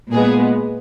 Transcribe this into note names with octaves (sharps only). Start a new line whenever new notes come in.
A#2 G#3 B3 G#4